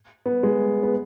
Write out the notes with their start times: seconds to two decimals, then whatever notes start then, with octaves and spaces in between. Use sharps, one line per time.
0.26 B3
0.43 G#3
0.83 B3